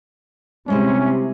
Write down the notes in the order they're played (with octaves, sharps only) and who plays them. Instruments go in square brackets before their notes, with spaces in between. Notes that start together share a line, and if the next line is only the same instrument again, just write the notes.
[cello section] C3 [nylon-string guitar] G3 G#3 E4 [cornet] C#4